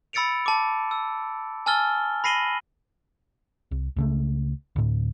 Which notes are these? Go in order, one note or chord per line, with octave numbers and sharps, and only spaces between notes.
B5 E6 A6 C#7 D7 F7
A5 D6
E6
G#5 A5 E6 F6 A6 G7
B5 A#6 C7 D#7 F#7 G7
C2
C#2 C#3 A3
D2 A2